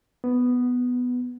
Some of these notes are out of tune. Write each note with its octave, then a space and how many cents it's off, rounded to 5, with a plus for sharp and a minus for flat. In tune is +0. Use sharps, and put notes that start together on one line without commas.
B3 +5